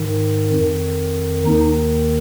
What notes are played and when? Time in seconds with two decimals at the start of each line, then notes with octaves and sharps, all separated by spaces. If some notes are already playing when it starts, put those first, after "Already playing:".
Already playing: G#2 D#3
0.53 F2 D#3
1.46 D#2 D#3 D#4